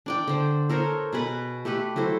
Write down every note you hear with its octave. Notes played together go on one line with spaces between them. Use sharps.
D4 D5 G5
D3 C5
A4 A#4 C5 C#5
B2 G#4 B4
A3 G4 A4 B4
F#3 E4 A4 C5